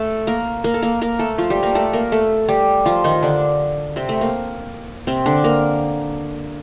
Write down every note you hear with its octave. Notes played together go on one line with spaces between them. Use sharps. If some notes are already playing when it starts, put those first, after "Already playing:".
Already playing: A3 A4
A#3 A#4
A#3 A#4
A4
A#3 A#4
A#3 A#4
A3 A4
F3 F4
G3 G4
A#3 A#4
A3 A4
A#3 A#4
A3 A4
G3 G4
F3 F4
D#3 D#4
D3 D4
C3 C4
A3
A#3
C3 C4
D3 D4
A#3 A#4